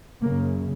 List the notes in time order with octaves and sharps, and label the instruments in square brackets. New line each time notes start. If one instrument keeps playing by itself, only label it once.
[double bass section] F#2 C#3 A#3